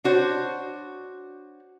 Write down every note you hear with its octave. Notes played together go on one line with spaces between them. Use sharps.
D4 F#4 C5 C#5